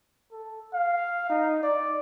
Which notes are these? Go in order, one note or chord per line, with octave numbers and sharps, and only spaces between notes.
A4
F5
D#4
D5